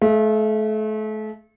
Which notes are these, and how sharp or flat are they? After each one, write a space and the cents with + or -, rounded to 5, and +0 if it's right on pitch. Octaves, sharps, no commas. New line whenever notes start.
A3 -35 E5 +45